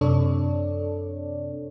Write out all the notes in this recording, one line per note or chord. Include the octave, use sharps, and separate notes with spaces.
F#2 C3 D4 A4 C#5 D5